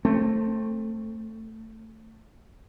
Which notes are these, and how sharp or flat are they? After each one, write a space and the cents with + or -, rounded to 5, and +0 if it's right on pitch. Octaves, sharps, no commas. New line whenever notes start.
A3 +15 C4 +25